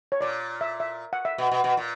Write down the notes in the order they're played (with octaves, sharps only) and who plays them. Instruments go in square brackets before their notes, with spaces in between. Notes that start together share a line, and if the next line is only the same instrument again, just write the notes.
[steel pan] C#5
[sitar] A#2 [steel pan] D5
[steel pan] E5
E5
F#5
E5
[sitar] B2
B2
B2
A#2